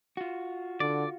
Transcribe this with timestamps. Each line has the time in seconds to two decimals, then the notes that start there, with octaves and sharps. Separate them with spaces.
0.17 F4 F#4
0.80 D3 D5